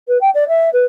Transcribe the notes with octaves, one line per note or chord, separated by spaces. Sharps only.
B4
G5
D5
E5
B4